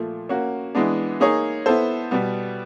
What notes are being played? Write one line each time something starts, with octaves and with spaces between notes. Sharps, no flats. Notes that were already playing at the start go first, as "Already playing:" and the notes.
Already playing: A#2 F3 A3
A#3 C#4 F#4
E3 G#3 B3 D4
A#3 D#4 G#4 C#5
B3 E4 A4 C5
B2 G3 B3